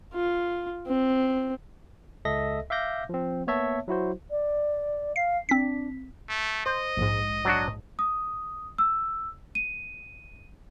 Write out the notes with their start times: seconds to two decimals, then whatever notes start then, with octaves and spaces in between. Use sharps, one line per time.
0.14 F4
0.87 C4
2.25 C#2 A4 D#5 E5 A#6
2.70 E5 F5 D6 G6 A#6
3.09 F3 C4
3.47 A#3 B3 C#5 E5 A5
3.88 F#3 E4 F#4 C5
4.30 D5
5.16 F5 C7
5.49 C4 D4 B6
6.29 A3
6.66 C5 D#5
6.97 A#1 G#2
7.45 F#3 D4 F#4
7.99 D#6
8.78 E6
9.55 D#7